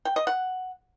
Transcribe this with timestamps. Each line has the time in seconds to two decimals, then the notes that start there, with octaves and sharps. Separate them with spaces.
0.05 G5
0.16 D#5
0.27 F#5